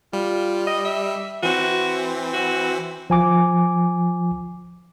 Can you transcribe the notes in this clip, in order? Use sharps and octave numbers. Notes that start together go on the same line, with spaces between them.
G3 F4
D#5
E5
E3 C4 F#4
F#4
F3 G#5 D6